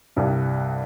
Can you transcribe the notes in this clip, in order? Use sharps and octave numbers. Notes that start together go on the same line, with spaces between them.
C2 G2